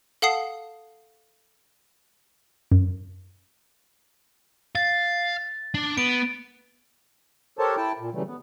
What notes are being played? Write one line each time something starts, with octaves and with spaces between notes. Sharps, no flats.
A4 F5 F#5 A5 D#6 C7
F#2
F5 A6
D4
B3 D7
G4 A4 A#4 C5 C#5 A5
E4 G5 A5
A#2
C#3 E3 F#3 G3 A3
B3